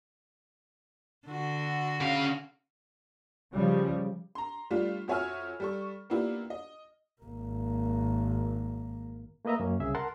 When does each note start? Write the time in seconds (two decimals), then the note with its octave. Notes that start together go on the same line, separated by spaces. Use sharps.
1.28 D3 F#4
2.00 C#3 F5
3.54 C#3 F3 G3
4.35 A#5 C6
4.71 G3 A3 D4 F4
5.08 F2 F#4 C#5 E5 G#5 F6
5.60 G3 A4 C#6
6.10 A#3 B3 D4 E4 F4 G4
6.50 D#5
7.22 G#1 A#3
9.45 A3 A#3 B4 D#5 E5 A#5
9.60 F#2 A#3 C#4
9.80 C2 C#3 G#4 E5
9.95 A#4 F#5 A5 C6